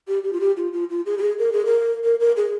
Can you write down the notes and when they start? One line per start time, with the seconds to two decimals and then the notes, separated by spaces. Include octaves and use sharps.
0.08 G4
0.23 G4
0.33 F4
0.40 G4
0.57 F4
0.73 F4
0.90 F4
1.06 G#4
1.18 G4
1.22 G#4
1.39 A#4
1.52 G#4
1.66 A#4
2.04 A#4
2.20 A#4
2.37 G#4